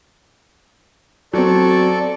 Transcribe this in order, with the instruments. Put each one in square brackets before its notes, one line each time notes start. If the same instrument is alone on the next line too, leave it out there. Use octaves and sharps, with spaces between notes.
[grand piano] F#3 C4 [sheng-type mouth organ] A4 D5 C#6